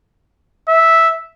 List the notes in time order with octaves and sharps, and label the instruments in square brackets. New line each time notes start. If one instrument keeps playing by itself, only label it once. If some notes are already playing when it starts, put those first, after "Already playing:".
[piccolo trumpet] E5